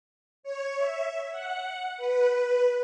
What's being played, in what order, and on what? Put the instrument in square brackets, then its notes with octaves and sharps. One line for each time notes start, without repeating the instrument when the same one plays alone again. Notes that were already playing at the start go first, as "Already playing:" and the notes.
[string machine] C#5
E5
F#5
B4